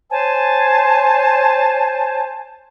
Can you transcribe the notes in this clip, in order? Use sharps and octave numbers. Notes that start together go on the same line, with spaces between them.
C5 C#5 G#5 A5